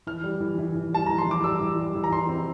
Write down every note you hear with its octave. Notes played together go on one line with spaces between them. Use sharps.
E3 F6
G3
E3
E3
E3
G3 A5
E3 A#5
C6
E3 D6
G3 E6
E3
G3
E3
A#5
E3 C6
C4